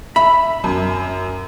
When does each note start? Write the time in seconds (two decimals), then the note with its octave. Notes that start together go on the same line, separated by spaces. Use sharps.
0.16 E5 B5
0.64 F#2